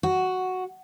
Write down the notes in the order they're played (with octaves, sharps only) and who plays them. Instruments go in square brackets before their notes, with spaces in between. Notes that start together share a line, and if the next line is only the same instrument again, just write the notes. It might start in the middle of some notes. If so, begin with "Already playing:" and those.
[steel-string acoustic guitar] F#4